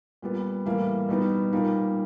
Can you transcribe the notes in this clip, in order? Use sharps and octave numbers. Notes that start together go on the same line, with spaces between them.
A#2 G3 B3
A2 E3 G3 A#3
B2 G3 B3 D#4
A#2 G3 A#3 D#4